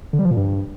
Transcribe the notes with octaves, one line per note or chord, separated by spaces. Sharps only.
D3
G3
F3
A#2
G2